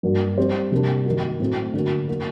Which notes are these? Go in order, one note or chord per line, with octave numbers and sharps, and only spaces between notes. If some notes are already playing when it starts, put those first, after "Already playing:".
G2 F#3 A#3 F#4
G3 C4 G4 C5
C3 G3 A#3 D4
D#3 F#3 A#3 F#4
A2 F#3 A3 C4
D3 F#3 A#3 F#4
F#3 A#3 F#4